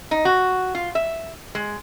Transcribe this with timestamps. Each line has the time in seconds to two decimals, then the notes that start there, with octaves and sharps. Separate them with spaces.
0.11 D#4
0.25 F#4
0.75 F4
0.95 E5
1.55 G#3